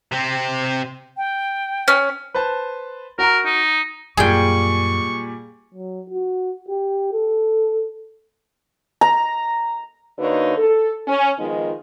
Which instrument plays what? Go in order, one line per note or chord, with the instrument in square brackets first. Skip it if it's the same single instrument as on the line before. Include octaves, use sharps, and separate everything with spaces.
[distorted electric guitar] C3 C4
[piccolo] G5
[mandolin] C#4
[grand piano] B4 C5 A5
[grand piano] F#4 A#5 [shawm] A#4
[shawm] D#4
[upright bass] F#2 [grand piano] A#2 G3 G#5 [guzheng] G#4 G5 [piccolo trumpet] C#6
[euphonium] F#3
F#4
G4
A4
[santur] A#5
[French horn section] D3 A#3 D#4 F#4 B4 C#5
A4
C#4
D#3 F3 G#3 B3 D#4 F4